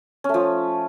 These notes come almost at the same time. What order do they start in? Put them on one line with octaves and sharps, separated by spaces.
C#4 A3 F3